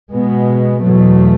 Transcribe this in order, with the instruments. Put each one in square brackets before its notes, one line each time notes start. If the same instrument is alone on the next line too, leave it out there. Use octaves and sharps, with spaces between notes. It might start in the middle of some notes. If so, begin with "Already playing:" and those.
[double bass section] B2 G#3 B3
E2 B2 F#3 A3